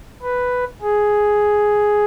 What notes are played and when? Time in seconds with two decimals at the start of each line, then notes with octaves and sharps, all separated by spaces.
0.22 B4
0.82 G#4